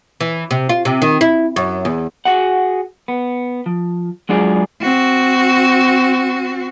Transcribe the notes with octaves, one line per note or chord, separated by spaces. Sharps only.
E3
C3
F4
C3
D#3
E4
F#2
E2
F#4 G#4 F#5
B3
F3
F#3 G#3 D4 F4 G#4
C4 F#4